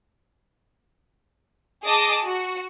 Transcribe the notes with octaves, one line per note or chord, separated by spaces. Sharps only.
G#4 D#5 A5 D6 D#6
F#4